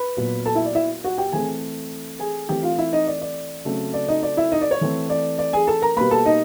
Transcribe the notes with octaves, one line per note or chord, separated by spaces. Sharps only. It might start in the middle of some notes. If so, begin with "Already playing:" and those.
Already playing: B4 B5
A#2 F#3 B3
A4 A5
E4 E5
D5
E4 E5
F#4 F#5
G4 G5
E3 A3 C4 G#4 G#5
G#4 G#5
E3 A3 C4 G4 G5
F4 F5
E4 E5
D#4 D#5
D5
D5
C#3 F#3 A3 C4
D5
D#4 D#5
D5
E4 E5
D#4 D#5
D5
C#5
E3 A3 C4
D5
D5
G#4 G#5
A4 A5
A#4 A#5
B2 G3 A#3 B4 B5
A4 A5
D#4 D#5